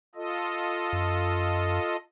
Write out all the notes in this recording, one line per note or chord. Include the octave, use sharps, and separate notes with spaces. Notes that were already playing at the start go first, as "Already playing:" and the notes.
F4 A4 D#5
F#2